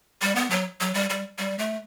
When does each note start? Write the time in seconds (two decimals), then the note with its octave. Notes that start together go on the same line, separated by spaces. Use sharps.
0.22 G3
0.35 B3
0.50 F#3
0.80 F#3
0.94 G3
1.10 G3
1.38 G3
1.59 A3